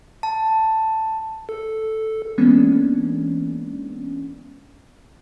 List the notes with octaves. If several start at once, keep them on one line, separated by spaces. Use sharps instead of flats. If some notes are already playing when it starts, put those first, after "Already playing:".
A5
A4
E3 G#3 A#3 B3 C#4 D4